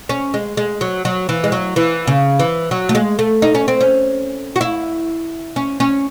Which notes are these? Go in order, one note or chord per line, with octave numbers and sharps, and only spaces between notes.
C#4
G#3
G#3
F#3
F#3
E3
G#3
F#3
E3
C#3
E3
F#3
A3
G#3
A3
D#4
C#4
C4
C#4
F#4
E4
C#4
C#4